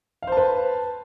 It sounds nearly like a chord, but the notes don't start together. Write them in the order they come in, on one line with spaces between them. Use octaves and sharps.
F5 C5 A5 B4